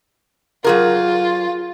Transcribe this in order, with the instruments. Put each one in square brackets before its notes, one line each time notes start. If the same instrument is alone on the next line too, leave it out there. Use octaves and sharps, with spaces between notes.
[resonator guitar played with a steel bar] F#3 G#4 A#4 [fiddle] F4